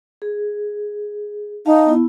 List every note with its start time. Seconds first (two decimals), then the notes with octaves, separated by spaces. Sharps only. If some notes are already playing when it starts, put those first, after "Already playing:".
0.22 G#4
1.66 D#4 F5 A5
1.86 B3 E4